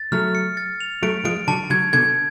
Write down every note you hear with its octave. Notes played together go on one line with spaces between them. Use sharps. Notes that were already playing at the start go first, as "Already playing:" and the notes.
Already playing: A6
F#3 A3 F6
C#7
A6
F7
F#3 A3 D7
F3 G#3 D7
D3 F#3 A5
D3 F#3 G#6
B2 D3 G#6